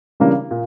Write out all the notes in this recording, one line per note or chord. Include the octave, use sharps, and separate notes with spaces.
C#3 E3 G3 A#3 D4
A#2